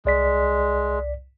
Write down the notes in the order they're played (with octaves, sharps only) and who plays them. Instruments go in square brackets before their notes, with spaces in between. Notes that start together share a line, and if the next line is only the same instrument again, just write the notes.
[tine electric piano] C2 D5 B6 [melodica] G#3